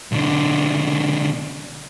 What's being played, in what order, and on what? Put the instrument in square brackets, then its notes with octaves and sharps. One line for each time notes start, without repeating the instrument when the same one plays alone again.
[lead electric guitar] B1 D3